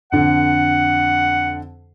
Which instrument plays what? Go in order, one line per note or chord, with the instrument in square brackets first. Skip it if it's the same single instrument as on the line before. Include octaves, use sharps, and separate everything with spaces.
[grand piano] F2 D3 [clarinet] F#5